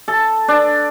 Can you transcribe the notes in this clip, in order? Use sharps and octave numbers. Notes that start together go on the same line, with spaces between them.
A4
D4